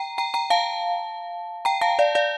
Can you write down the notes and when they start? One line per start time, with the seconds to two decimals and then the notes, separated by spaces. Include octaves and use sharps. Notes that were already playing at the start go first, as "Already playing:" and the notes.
Already playing: G5 A#5
0.18 G5 A#5
0.34 G5 A#5
0.50 F5 A5
1.65 G5 A#5
1.81 F5 A5
1.99 D5 F5
2.15 D5 F5